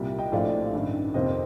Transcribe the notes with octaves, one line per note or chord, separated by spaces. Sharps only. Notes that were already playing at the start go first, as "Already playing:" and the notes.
Already playing: C2 A#2 G3
D#5 G5
A#1 A2 F3 A3 D5 F5
A1 G2 D#3
F2 C3 F3 A#3 C5 D#5